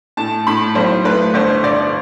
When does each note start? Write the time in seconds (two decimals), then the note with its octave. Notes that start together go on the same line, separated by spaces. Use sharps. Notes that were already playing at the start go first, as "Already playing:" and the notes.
0.17 A2 A5
0.47 A2 B5
0.75 B1 C5
1.05 A3 B4
1.34 G1 C5
1.64 G1 D5